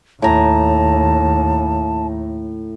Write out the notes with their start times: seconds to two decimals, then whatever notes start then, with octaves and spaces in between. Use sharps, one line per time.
0.22 D#2 A2 A5 A#5